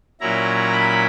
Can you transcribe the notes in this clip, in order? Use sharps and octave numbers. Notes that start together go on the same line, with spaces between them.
A#2 F#3 C#4 E4 A#5
B5